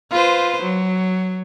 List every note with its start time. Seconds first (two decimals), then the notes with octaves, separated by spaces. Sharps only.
0.11 F4 B4 C5
0.62 F#3